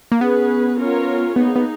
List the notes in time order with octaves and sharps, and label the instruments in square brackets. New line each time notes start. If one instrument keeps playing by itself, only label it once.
[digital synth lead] A#3
[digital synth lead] B3 [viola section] C#4 G#4 B4
[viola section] C#4 F4 A#4 C#5
[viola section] A#3 D#4 G#4 [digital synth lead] B3
[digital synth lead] B3